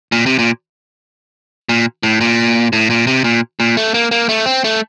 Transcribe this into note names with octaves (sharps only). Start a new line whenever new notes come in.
A#2
C3
A#2
A#2
A2
A#2
A2
A#2
C3
A#2
A#2
A3
A#3
A#3
A3
C4
A3